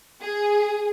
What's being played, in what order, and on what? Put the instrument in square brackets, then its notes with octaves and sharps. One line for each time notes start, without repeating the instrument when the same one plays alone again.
[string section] G#4